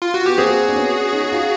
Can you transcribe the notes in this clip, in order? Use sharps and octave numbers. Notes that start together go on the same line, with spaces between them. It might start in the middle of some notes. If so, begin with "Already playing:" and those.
F4
F#4
B3 G4
A#3 C4 F#4 G#4
D4
B3 C#4
C#4 D#4
D#4 F4